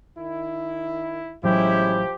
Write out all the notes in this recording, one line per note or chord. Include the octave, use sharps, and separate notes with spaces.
D#3 E4
A1 F3 F#3 G#3 C#4 E4 G4